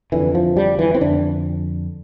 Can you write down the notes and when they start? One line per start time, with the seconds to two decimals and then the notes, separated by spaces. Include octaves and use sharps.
0.12 F2 D3 E3
0.35 F3
0.57 G3
0.79 E3
0.94 C4
1.00 F2 D3 D4